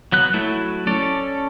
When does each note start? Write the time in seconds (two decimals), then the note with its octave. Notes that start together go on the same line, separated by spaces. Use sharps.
0.12 F#3 B3 F#6
0.34 F#3 A3 E4
0.87 C#4 A4 D5